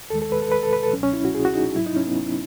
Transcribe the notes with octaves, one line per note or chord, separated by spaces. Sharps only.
D#2 D#3 G#3 A4
A4
B4
A4
B4
A4
B4
A4
C#2 B2 F#3 C#4
C#4
E4
F#4
G#4
F#4
D#4
G#2 F#3 E4
D#4
C#4
B3